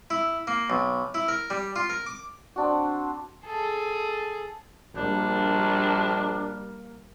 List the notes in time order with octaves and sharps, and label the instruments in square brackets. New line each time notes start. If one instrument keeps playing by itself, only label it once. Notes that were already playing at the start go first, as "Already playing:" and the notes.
[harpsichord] E4
A#3
B1
E4
A#4
G3
F4
A#4
D6
[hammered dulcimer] C4 D4 F#4
[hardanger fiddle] G#4 A4
[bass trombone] A#1 [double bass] G3 [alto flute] A#3 [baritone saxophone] D4